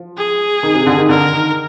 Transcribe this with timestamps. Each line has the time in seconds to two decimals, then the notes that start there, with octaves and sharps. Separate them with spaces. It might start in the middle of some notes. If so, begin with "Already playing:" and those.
Already playing: F3
0.17 G#4
0.63 D#3
0.74 C3
0.86 D3
0.98 D#3
1.09 D3 A#4
1.33 D#3